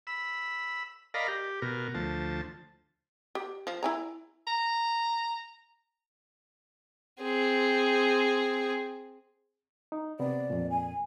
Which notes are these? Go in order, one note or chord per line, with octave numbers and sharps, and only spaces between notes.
B5 E6
A#4 D5 D#5 F5 A#5 B5
G4
B2 A#4
D2 F3 A5
G4
F3
E4 G#5 A#5
A#5
C4 G#4
D#4
C3 B3 D5
F2 A#2
G#5